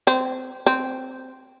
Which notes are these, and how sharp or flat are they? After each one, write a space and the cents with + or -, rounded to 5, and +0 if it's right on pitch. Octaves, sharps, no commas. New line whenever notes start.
C4 -20
C4 -10